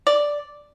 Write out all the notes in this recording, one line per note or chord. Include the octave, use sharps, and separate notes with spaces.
D5